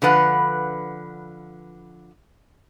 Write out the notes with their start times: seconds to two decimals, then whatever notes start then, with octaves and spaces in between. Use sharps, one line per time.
0.02 D3 F3 B4 F#5